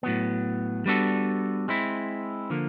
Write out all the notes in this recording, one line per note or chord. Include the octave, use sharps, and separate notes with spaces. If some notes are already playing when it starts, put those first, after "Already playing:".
A2 F#3 B3
G3 B3 D4 F#4 A4
G#3 C4 E4
D3 F3 A#3